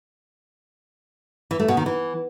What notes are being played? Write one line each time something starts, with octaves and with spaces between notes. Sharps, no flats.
E3
A3
B2
D#3
E3